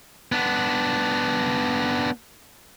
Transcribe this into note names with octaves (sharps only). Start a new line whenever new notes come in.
B3 D4